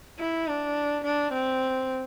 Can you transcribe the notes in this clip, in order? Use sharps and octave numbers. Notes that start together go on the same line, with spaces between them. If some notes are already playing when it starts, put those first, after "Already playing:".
E4
D4
D4
C4